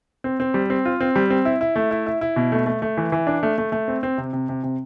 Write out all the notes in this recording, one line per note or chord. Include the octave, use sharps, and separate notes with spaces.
C4
C4
G3
C4
F4
C4
G3
C4
E4
E4
A3
E4
E4
E4
B2
A3
A3
A3
E3
E3
D4
A3
A3
A3
C4
C4
C3
C3
C3
C3